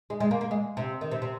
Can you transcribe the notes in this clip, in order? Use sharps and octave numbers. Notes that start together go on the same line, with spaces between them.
G#3
G#3
A#3
A#3
G#3
C3
D#3
C3
C3